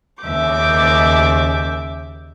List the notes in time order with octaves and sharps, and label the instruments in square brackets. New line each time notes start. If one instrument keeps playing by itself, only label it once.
[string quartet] D#2 C#3 E5 D6 G6